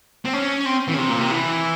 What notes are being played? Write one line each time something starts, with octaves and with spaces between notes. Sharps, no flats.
C4
C#4
C4
E3
C#3
C3
A#2
C3
E3